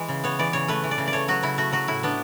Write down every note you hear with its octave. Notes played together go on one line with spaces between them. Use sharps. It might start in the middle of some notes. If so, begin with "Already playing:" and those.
Already playing: E3 G#3
C#3
B3 C#5
E3 D5
C#3 C#5
A3 B4
E3
D5
C#3
D5
A3 C#5
F#3 F#4
C#3 E4
A3 F#4
F#3 F#4
A2 E4
B3 D4